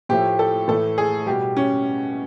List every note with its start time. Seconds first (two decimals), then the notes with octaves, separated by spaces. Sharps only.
0.09 A2 F3 A3 G4
0.39 A4
0.68 A2 E3 A3 A4
0.98 G#4
1.26 B2 G3 G4
1.57 C#4